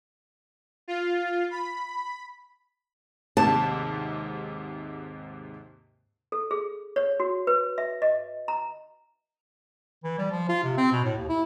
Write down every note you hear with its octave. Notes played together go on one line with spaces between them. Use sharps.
F4
B5
D#2 G#2 C3 A5
A4
G#4
C#5
F#4
B4
E5
D#5
A#5
E3
G3
F3
F4
C3
C4
B2
A2
D#2
E4